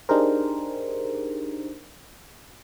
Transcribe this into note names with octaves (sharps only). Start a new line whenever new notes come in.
D4 D#4 G4 G#4 A#4 C5